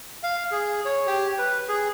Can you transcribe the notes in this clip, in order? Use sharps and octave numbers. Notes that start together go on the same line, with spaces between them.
F5
G#4
C#5
G4
B4
G#4